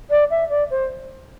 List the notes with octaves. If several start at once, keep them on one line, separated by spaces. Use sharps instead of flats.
D5
E5
D5
C5